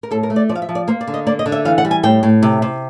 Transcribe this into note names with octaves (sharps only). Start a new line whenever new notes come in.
A#4
A2 A4
A#4
A3
D5
F3 D5
F5
E5
F3
D5
A#3 C5
D5
D3
D#5
A#3 D5
D#5
D3
E5
E3 F5
F#5
G3
G#5
A2 G5
A2
C3
C3